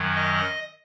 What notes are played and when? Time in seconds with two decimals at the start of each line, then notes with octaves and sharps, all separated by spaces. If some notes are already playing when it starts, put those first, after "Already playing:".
Already playing: F#2 D#3 F#3
0.16 D#5